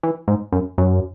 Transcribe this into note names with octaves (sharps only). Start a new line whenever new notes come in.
E3
G#2
F#2
F#2